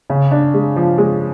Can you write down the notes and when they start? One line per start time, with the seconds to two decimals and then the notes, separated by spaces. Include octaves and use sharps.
0.10 C#3
0.31 D4
0.54 G#3
0.76 F3
0.98 G#3